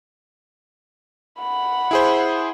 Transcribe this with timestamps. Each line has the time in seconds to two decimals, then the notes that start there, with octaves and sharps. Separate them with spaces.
1.40 F#5 B5
1.91 E4 G#4 C5